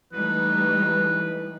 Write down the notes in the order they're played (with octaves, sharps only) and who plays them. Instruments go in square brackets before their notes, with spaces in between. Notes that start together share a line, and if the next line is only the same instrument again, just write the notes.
[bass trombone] E3 [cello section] G3 A3 D#4 [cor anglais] B4